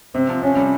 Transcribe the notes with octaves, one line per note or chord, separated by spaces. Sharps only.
C3 C4
F3
C3 C#4
G3